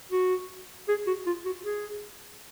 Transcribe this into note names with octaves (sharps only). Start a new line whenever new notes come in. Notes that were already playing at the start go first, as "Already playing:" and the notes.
F#4
G#4
F#4
F4
F#4
G#4